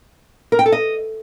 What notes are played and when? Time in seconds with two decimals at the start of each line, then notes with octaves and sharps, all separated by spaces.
0.52 A#4
0.59 G5
0.66 A4
0.72 D#5